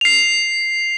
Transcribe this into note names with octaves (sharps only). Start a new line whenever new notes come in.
C7 F7